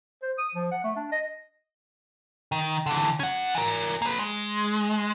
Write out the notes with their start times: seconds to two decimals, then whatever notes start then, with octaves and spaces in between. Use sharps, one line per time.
0.22 C5
0.38 D#6
0.55 F3
0.71 F#5
0.84 A3
0.96 D4
1.12 D#5
2.52 D#3
2.86 D3 E3
3.20 C#4 F#5
3.55 E3 A#4
4.02 A#3 B4
4.19 G#3